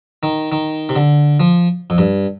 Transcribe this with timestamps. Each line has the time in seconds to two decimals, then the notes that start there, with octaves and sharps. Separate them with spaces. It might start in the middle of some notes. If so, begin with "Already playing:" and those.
0.23 D#3
0.52 D#3
0.89 C3
0.96 D3
1.40 F3
1.90 F2
1.98 G2